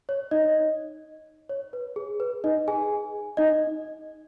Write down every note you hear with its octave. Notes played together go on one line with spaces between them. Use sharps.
C#5
D#4 D#5
C#5
B4
G#4
B4
D#4 D#5
G#4 G#5
D#4 D#5